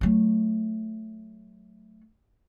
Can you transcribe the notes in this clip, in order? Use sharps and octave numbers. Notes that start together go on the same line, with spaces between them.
F#3 A3